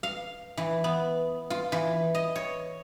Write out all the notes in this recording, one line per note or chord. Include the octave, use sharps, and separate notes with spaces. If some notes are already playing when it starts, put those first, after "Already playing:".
F5
E3
B3
F4
E3
D#5
C#5